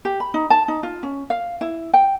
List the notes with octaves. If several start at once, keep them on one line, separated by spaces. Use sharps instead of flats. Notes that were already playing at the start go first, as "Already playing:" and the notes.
G4
B5
D#4
A5
D#4
F4
C#4
F5
E4
G5